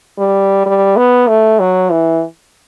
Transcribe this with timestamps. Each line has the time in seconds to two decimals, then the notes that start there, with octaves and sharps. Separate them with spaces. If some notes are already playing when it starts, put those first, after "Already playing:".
0.18 G3
0.66 G3
0.96 B3
1.28 A3
1.59 F#3
1.90 E3